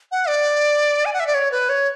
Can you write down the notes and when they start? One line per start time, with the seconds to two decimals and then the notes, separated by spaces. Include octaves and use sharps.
0.12 F#5
0.28 D5
1.05 G#5
1.13 F#5
1.20 E5
1.27 D5
1.34 C#5
1.51 B4
1.69 C#5